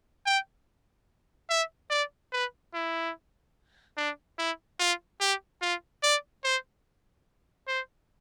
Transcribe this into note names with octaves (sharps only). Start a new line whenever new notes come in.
G5
E5
D5
B4
E4
D4
E4
F4
G4
F4
D5
C5
C5